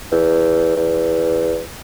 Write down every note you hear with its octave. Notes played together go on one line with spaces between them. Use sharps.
E2
E2